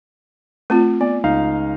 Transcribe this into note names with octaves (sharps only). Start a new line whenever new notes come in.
A3 C4 F4
B3 D5
C#2 D#4 F5